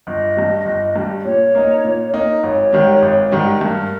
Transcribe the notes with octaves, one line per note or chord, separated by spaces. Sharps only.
G1 D#5
G2 G3
G1
G2 G3
A#2 C#5
A#3 D#4
A#2
A#3 D#4
G#1 C#5
G#2 D#3 G3
G#1
G#2 D#3 G3
G2 A#4